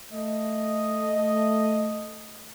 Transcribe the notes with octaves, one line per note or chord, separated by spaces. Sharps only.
A3 D#5